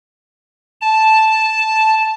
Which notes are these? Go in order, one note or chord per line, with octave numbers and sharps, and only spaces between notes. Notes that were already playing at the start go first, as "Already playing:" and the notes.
A5